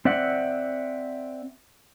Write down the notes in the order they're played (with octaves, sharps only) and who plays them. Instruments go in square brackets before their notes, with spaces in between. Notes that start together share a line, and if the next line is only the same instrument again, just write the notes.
[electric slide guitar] C4 D5 E5 F#5